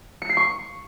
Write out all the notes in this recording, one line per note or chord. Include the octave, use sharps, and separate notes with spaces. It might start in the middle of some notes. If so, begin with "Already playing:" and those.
C#7
C7
C#6